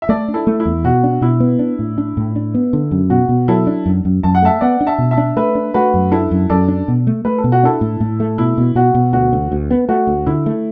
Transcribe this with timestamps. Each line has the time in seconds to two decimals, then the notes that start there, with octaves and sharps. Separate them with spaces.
0.02 E5
0.09 A3 A4 D5
0.28 D4
0.34 E4 A4
0.47 A3
0.60 E4
0.66 E2
0.84 B2 F#4
1.04 D4
1.22 B2 E4
1.40 B3
1.59 D4
1.79 A2
1.98 D4
2.17 A2
2.36 D4
2.54 B3
2.73 D3
2.91 F#2
3.10 B2 F#4
3.29 B2
3.48 F#3 E4 A4
3.67 D4
3.86 F#2
4.05 F#2
4.23 F#2 A5
4.35 F#5
4.42 A3 E5 A5
4.61 B3 D5 F#5
4.81 D4
4.87 E5 A5
4.98 B2
5.11 E5 A5
5.18 D4
5.36 A3 B4 E5
5.55 D4
5.74 A3 F#4 B4
5.94 F#2
6.12 D4 E4 A4
6.31 F#2
6.50 F#2 A4 D5
6.68 D4
6.88 B2
7.07 A3
7.25 A3 B4
7.38 A4
7.44 B2
7.52 F#4
7.63 D4 E4 A4
7.81 A2
8.00 A2
8.20 A3
8.38 B2 E4
8.58 B2
8.75 B2 F#4
8.95 B2
9.13 D2 F#4
9.33 D2
9.52 D2
9.71 B3
9.89 A3 F#4
10.07 D2
10.26 D3 E4
10.46 A3